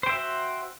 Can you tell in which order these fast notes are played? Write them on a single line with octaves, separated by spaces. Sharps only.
C5 G5 E5 F#4